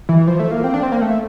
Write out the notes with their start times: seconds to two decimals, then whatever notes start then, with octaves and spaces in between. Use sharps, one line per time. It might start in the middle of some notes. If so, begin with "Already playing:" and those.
0.09 E3
0.27 F3
0.40 A3
0.51 A#3
0.64 C4
0.74 D4
0.83 C4
0.92 A#3
1.01 A3